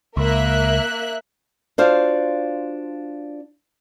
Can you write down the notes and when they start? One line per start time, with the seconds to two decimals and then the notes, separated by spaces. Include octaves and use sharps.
0.17 C#2 A#3 E5 F#6
1.78 D4 F4 F#4 C5 F5